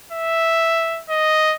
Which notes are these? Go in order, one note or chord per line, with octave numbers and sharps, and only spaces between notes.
E5
D#5